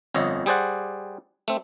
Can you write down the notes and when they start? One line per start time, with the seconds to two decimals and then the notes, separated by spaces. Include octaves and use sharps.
0.14 G1 F2 C#5 D#5
0.46 G3 G#4 C5 D5 F#5
1.48 A3 C4